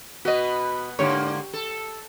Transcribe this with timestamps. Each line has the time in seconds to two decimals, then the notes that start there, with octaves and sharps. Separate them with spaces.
0.25 B2 B3 F#4 D#5
0.99 G#2 D3 A#3 G4 C#5
1.53 A4